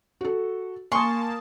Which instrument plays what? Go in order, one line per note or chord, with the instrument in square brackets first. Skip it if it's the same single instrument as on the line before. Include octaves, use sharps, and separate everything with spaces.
[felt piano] F#4 A4
[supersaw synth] A#3 A5 [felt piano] G#5 D#6 [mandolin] C6 C#6